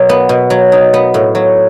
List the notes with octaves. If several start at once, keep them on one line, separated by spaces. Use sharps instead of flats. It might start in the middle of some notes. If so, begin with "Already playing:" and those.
Already playing: B2 F#3
B3
B2
F#3
D#4
B3
A2
F#3